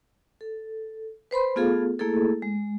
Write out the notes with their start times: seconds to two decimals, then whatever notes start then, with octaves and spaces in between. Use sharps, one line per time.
0.41 A4
1.31 B4 C5 B5 C6
1.56 A3 B3 F4 G#4 A4 F5
1.99 A3 A#3 E4 G#4 A4
2.42 G#3